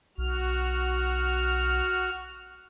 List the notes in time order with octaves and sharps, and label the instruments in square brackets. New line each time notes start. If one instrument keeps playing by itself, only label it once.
[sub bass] B1 [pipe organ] F#4 F6